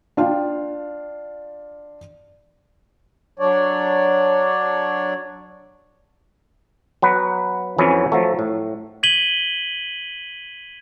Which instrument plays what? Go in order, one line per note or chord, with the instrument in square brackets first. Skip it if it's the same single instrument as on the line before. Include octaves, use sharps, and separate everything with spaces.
[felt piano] D4 F4 F5 G5
[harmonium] F#3 D4 C#5 D5
[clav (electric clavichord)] F#3 B3 B4
F2 E3 F#3 B3 C#4
F3 F#3 A3
A2
[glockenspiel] G#6 B6 D#7 F#7 G7